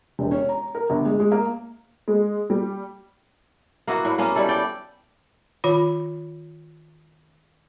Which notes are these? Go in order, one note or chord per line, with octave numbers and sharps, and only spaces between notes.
E1
C#4
A#5
A#4
G1
G#3
G#3
A#3
G#3
G3
A#3 B3 E4 F#4
A2
A#3 B3 C#4
G3 E4 A4
D5 G5
D#3 F4 B5